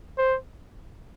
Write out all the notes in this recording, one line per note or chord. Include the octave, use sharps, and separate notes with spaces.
C5